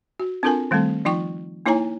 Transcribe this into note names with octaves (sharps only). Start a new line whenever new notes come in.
F#4
C4 D4 F4 A4 A#4 G#5
D#3 G3 A3 C4 A4
F3 D#4 F4 G5 C#6
A#3 D#4 E4 C#5 G#5 A#5